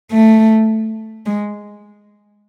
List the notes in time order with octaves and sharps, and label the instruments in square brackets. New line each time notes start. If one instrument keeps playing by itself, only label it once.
[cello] A3
G#3